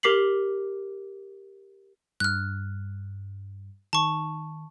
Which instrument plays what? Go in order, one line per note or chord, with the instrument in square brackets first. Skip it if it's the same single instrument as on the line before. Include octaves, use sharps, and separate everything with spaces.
[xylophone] G4 A#4 D6 B6 C7 F#7
[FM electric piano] G2 [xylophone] F6 F#6
[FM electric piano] D#3 [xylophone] A5 C#6